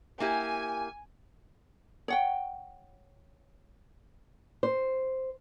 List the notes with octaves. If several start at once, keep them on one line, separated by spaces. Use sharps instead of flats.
A#3 E4 G4 G#5
C#5 F#5 G5
C5